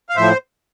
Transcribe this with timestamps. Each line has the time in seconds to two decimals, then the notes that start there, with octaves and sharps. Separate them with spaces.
0.09 F5
0.16 A2 F3 C5 E5